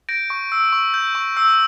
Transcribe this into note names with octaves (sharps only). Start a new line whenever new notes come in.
G6 A#6 D7
C#6
E6
C#6
G6
C#6
E6